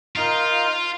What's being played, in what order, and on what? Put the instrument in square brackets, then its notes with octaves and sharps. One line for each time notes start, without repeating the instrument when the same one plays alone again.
[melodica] D#4 A#4 F5 [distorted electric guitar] F4